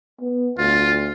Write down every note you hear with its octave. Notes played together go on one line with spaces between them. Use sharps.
B3
D2 F4